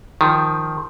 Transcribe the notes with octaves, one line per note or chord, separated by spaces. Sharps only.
D#3 F3